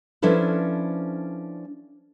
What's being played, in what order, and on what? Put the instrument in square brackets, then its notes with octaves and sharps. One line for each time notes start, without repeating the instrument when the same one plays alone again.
[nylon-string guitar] F3 C#4 D4 E4 A4 B4